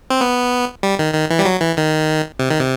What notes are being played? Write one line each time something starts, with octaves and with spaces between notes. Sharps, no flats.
C4
B3
G3
D#3
D#3
E3
G3
F#3
E3
D#3
C3
D#3
C3